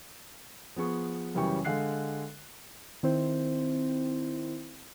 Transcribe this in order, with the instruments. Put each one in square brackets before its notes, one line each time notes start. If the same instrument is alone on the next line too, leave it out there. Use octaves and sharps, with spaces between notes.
[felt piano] F3 B3 G#4 C#6
F#2 C#3 E3 G3 G5 C#6
D3 G#3 F5 F#6 C7
[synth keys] D#3 C4 E4 C5